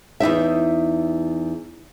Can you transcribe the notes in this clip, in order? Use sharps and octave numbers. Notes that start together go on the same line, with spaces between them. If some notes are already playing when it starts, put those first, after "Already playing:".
E2 G#2 D#4 E5